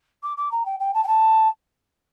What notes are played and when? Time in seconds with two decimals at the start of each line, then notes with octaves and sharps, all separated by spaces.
0.23 D6
0.37 D6
0.51 A#5
0.66 G5
0.80 G5
0.94 A5
1.04 G5
1.07 A5